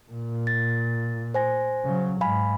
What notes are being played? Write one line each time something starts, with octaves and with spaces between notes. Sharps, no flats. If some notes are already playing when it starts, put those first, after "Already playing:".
A#2
A6
C5 G#5 A#6
C#3 F#3
G#2 F5 G#5 B5